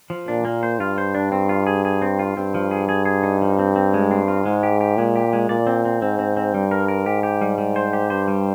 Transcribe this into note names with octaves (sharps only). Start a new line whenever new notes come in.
F3
A#2 D4
A#3
C5
G2 F4
C5
D4
C4
F4
G#4
G#4
C4
F4
G2 C4
F3
G#4
G#4
G#4
D#4
F3
C4
C4
G#3
C4
F4
G#2 G#3
G4
G4
A#2 G#3
G4
G#3
A#2 D5
C4
C4
G#2 C4
C4
C4
G2 G3
A#4
A#4
G#2 G4
G4
G3
G3
C5
G4
G2 C5
G3